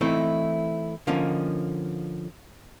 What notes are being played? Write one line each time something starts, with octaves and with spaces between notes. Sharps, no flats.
E3 A3 C4 D#4 E4
D3 F3 A#3 C#4 D#4